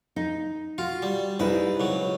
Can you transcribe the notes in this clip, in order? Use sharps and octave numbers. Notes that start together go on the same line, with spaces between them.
D#4
F4 F#4
G3
C2 D#4 E4 G#4 B4
C#2 F#3